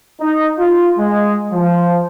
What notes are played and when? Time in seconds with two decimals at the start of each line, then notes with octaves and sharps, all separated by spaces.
0.21 D#4
0.59 F4
0.98 G#3
1.51 F3